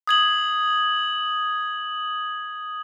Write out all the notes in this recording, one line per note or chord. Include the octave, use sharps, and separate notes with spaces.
D#6 G#6 F#7